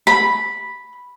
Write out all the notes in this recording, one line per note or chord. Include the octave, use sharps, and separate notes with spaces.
B5